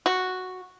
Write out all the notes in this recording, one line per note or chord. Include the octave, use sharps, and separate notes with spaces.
F#4